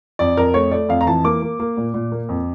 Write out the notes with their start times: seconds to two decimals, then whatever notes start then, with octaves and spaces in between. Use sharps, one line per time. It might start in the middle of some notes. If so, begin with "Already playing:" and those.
0.19 F2 D5
0.37 F2 A#4
0.54 A3 C#5
0.72 A3 D5
0.89 F2 F5
1.01 A#5
1.06 E3 A5
1.24 A#3 D6
1.42 A#3
1.60 A#3
1.77 A#2
1.94 A#2
2.12 A#3
2.29 F2